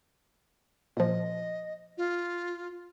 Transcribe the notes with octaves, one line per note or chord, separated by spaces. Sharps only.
A#2 F3 D#5
F4